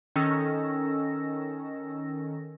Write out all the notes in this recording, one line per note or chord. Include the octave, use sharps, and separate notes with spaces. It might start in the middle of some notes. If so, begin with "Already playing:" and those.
D#3 C#4 A4 E6 A#6